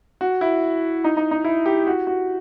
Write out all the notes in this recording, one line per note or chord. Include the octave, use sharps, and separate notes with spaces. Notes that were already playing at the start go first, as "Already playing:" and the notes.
F#4
E4
D#4
D#4
D#4
E4
G4
F#4
F#4